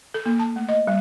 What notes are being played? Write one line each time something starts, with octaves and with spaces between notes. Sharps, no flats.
A4
A#3
A5
A3
D#5
G3